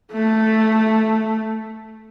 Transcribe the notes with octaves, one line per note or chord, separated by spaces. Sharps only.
A3